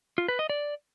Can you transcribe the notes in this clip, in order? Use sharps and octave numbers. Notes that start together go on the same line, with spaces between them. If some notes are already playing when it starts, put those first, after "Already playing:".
F4
B4
D#5
D5